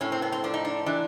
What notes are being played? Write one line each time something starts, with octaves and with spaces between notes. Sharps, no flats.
A2 C#4
C4
B3
C4
F3 D4
D#4
D4
E3 D4